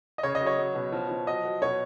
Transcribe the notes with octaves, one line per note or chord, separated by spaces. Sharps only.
D#5
C#3 C#5
D#5
F#3
C#5
F#3
B2
F3
F3
F#3 D#5
F#3
B2 C#5